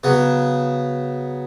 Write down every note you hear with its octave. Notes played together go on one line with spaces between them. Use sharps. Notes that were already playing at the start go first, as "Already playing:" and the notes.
C#3 F#3 B3